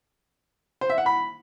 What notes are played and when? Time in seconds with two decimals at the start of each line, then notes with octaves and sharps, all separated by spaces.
0.81 C5
0.90 E5
0.98 F#5
1.06 B5